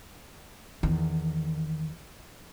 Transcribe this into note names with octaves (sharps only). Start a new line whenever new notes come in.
E2 D#3